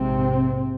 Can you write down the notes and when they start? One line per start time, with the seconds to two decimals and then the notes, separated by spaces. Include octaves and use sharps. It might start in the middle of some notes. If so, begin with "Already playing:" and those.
Already playing: A#1 G#2 C3 C4